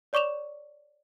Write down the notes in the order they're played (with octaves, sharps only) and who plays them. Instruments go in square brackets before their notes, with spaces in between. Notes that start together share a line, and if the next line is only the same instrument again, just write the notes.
[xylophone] C#5 D5 C#6 D6 E7 F7